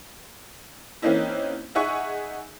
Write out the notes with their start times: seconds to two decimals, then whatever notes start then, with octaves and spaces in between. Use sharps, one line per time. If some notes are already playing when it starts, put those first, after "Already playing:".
1.02 E3 A#3 C4 C#4 D#4 E4
1.75 D#4 G#4 E5 F#5 G#5 C#6